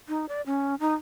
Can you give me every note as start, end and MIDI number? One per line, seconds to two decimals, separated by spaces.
0.09 0.26 63
0.29 0.42 74
0.46 0.75 61
0.80 0.94 63